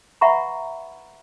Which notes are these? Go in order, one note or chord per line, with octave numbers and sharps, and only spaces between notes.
B4 E5 F#5 A#5 B5 C#6